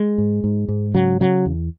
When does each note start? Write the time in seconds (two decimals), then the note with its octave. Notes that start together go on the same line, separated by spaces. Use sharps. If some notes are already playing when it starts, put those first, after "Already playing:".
Already playing: G#3
0.18 G#2
0.44 G#2
0.69 G#2
0.94 C#3 F#3
1.20 C#3 F#3
1.46 E2